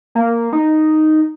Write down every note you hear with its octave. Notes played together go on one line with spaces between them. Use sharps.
A#3
D#4